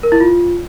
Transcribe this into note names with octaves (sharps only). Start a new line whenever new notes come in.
A#4
E4
F4